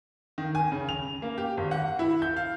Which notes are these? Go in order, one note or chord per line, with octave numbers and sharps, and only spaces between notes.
D#3
G#5
C#3
F7
A#3
G4
G#1
F#5
E4
G6
F5